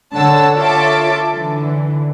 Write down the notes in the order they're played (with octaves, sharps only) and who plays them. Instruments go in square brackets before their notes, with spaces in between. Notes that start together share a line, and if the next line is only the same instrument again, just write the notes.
[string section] D3 C#5 F#5 A5 E6
F4 A4 C#5 E5 A5 D6
D3 E3